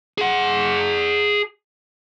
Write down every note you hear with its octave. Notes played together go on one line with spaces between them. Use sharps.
G#4 F#5